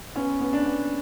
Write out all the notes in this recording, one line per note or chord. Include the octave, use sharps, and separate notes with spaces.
B3 C#4
B3
D4
B3